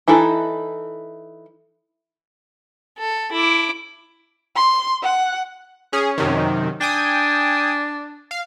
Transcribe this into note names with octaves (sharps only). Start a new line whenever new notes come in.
E3 D#4 E4 A4
A4
E4 D6
C6
F#5
C#4 G#4
F#2 C3 D#3
D4 G5 G#5 D#6
F5